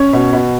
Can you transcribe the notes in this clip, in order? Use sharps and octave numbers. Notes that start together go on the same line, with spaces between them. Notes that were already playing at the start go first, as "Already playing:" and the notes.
Already playing: C#4 C#5
B2
B2